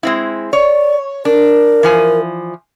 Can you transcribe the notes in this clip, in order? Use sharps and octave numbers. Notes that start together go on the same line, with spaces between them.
G#3 C4 E4
C#5 D5
D4 A#4
E3 F3 G#5